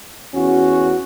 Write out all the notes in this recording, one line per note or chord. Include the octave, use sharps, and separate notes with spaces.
E2 C#4 F#4